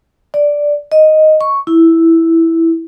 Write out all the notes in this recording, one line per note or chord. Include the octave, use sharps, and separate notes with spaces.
D5
D#5
C#6
E4